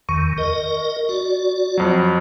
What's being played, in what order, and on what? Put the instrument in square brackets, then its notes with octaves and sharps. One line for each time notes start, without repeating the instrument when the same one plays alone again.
[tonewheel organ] E2 D#3 [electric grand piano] C#6
[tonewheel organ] A#4 D#5
F#4 D5
[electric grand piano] F2 F#3